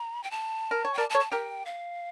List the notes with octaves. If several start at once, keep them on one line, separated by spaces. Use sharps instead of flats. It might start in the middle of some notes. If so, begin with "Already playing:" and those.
Already playing: A#5
G5
A5
A#4
C#5
G5
A#4 D5 A5
A5
A4 C#5
A5
G4 A#4 G5
F5